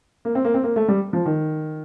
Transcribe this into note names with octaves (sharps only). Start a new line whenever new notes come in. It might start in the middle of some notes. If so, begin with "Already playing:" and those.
A#3
C4
A#3
C4
A#3
A3
G3
F3
D#3